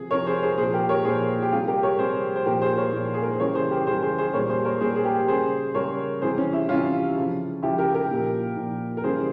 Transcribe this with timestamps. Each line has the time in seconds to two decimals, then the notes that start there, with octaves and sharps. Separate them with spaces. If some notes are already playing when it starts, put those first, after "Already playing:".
Already playing: C3 F3 G#4
0.11 C3 A#4 C#5
0.14 F3
0.27 G#4 C5
0.42 G#4 C5
0.58 A#2 G#4 C5
0.62 F3
0.74 G4 A#4
0.89 A#4 C#5
1.05 A#2 F3 G#4 C5
1.42 G4
1.52 C3 F4 G#4
1.55 G3
1.68 G4 A#4
1.83 A#4 C#5
1.99 C3 G3 G#4 C5
2.36 C5
2.46 A#2 F3 G4 A#4
2.61 G#4 C5
2.77 A#4 C#5
2.93 A#2 F3
3.14 G#4
3.22 A#4
3.31 C5
3.39 C#3 E3 G3 A#4 C#5
3.55 G#4 C5
3.71 G4 A#4
3.87 C#3 E3 G3 G#4 C5
4.02 G#4 C5
4.18 G#4 C5
4.34 A#2 G3 A#4 C#5
4.49 G#4 C5
4.65 A#4 C#5
4.80 A#2 G3 G#4 C5
4.96 G#4
5.05 G4 A#4
5.28 C#3 G3 G#4 C5
5.75 C#3 G3 A#4 C#5
6.22 C3 E3 G3 G#4 C5
6.38 C#4
6.53 E4
6.69 C3 E3 G3 C#4 F4
7.15 C#3 F3
7.62 C#3 F3 E4 G4
7.78 G4 A#4
7.94 G4 A#4
8.10 A#2 F3
8.57 A#2 F3
8.97 A#4
9.04 C#3 E3 G3 G#4 C5